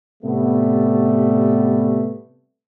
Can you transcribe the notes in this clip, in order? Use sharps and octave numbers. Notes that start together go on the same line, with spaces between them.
A2 C3 G3 A3 B3